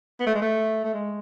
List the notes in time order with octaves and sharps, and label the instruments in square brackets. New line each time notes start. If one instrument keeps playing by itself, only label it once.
[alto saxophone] B3
A3
G#3
A3
A3
G#3